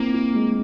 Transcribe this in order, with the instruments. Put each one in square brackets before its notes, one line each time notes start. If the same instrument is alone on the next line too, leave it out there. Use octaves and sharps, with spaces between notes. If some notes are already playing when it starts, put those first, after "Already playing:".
Already playing: [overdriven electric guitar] A#3 [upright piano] C4 E4
[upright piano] E4
G#3